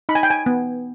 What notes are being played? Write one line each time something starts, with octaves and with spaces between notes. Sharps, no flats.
D#4 B5
G#5
G5
G#5
B3